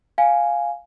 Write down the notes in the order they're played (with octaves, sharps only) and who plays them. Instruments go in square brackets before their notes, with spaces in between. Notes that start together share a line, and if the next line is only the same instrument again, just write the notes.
[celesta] F5 G#5